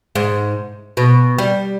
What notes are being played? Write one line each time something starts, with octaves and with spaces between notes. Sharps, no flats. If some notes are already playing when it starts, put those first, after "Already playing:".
G#2
B2
G3